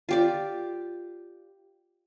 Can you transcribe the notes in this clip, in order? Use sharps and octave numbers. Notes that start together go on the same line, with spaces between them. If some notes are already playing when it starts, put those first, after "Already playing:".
F4 G4 D5